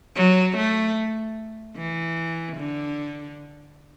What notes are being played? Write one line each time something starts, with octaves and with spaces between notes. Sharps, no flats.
F#3
A3
E3
D3